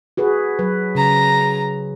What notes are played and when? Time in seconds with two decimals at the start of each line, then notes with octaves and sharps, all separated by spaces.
0.17 F#4 G#4 B4
0.59 F#3 B4
0.95 C#3 A#5